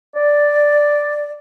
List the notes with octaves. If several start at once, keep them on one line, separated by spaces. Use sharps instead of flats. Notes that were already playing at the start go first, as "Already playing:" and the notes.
D5